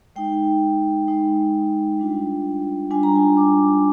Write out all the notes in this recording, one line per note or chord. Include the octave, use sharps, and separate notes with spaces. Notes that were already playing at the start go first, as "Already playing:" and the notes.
G#3 D#4 G5
G#3 D#4
G3 D4 F4
G3 D4 F4 G#5
A#5
G#5
D6